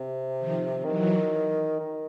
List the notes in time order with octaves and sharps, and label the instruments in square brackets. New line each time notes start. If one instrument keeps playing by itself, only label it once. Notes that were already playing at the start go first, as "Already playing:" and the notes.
Already playing: [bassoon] C3
[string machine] D#3 F3
[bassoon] D#3 [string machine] E3 F#3
[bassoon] D#3